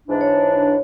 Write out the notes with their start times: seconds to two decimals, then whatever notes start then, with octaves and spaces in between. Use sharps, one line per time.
0.08 G#2 E3 D4
0.21 C#5